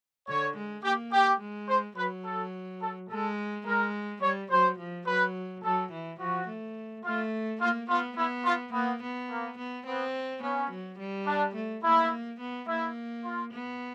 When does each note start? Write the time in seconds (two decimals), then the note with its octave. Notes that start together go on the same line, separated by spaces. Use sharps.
0.28 D3 C#5
0.57 G#3
0.84 A#3 G4
1.12 G4
1.41 G#3
1.68 C5
1.97 F#3 B4
2.25 A4
2.82 A4
3.10 G#3 A4
3.66 G#3 A#4
4.22 G3 C#5
4.51 F#3 C5
4.79 F3
5.07 F#3 B4
5.64 F#3 A4
5.92 E3
6.19 F3 F#4
6.47 A3
7.04 A3 F4
7.61 A#3 F4
7.89 B3 F4
8.16 B3 E4
8.45 F4
8.73 A#3 B3
9.02 B3
9.30 A#3
9.58 B3
9.86 B3 C4
10.43 B3 C#4
10.70 F#3
10.98 G3
11.26 D4
11.55 A3
11.84 A#3 E4
12.40 B3
12.68 A#3 E4
13.24 F4
13.52 B3